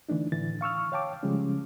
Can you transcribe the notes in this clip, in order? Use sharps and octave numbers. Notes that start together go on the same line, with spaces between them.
D3 E3 A3 D4 D#4
A2 D3 E3 A6
F5 C#6 E6 F6
C#5 F5 G5 A5 D6
C#3 F3 G3 G#3 C#4